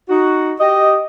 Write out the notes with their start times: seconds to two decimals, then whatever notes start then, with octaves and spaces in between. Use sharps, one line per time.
0.09 D#4 F#4
0.60 G4 D#5